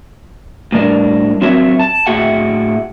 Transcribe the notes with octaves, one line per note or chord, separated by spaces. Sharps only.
A2 G3 D4 A#4
F#3 C4 F#4 A#4 C#5 E5
A5
A2 F#4 G#4 E5 F#5 G5